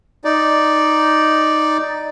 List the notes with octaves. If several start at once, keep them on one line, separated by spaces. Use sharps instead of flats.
D#4 D5